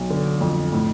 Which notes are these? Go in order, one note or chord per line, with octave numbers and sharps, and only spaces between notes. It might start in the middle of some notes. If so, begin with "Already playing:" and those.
Already playing: B1
D3
F2
A2